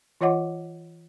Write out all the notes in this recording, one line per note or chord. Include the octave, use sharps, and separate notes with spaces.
E3 F4 C#5 D#5 F#5 D6